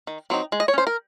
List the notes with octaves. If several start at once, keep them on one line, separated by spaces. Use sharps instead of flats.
D#3
F#3 C4 D#4
G#3
D#5
C#5
C#4 C5
A#4